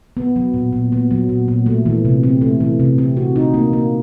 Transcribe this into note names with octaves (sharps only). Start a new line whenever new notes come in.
B3
F#3
A#2
A#2
B3
F#3
A#2
A#2
A3
E3
C3
C4
A3
E3
C3
C4
F#4
D#4
A#3
A#3